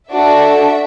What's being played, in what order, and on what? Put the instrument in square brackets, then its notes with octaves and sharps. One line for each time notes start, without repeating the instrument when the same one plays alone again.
[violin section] D4 F#4 A4 E5